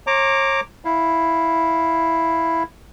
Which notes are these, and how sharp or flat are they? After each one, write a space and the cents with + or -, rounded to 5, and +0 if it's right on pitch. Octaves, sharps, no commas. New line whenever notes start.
C#5 -35 A#5 -10 D6 +0
E4 +0 F5 +0